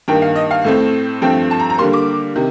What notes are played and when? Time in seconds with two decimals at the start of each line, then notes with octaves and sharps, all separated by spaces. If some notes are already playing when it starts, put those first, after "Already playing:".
0.08 G2 D#3 A#3 G5
0.22 F5
0.36 D#5
0.51 F5
0.64 A2 A3 C4
1.22 G2 F3 A3 C4 G5
1.51 A5
1.60 A#5
1.70 A#5
1.78 D3 G3 A#3 C6
1.93 D6
2.35 C3 D#3